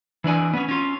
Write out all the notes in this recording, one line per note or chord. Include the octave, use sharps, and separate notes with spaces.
E3 D4 D5 G#5
B3 C#4
C#4 F4